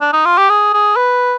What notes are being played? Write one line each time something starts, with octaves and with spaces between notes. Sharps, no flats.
D4
D#4
F4
G4
G#4
G#4
B4